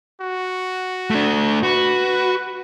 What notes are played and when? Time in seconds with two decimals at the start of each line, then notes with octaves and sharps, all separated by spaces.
0.21 F#4
1.10 A3 D4
1.63 F#4 B4